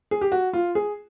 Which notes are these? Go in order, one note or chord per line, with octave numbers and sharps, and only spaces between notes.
G#4
G4
F#4
F4
G#4